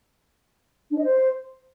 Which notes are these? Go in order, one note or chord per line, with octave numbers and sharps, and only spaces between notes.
D4
D#5
C5